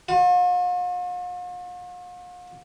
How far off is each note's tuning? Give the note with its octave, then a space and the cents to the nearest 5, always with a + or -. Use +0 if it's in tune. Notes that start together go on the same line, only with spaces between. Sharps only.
F4 +45